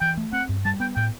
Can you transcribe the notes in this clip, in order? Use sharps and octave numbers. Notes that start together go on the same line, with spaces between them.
E3 G5
A3
C4 F#5
G2
G3 A5
B3 G5
A2 G5